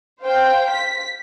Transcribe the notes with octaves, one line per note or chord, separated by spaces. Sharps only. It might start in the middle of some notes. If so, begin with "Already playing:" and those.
C5 F5 G5
B6